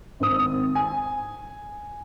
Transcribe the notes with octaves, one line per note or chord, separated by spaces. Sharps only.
G#1 C4 D#6
G#5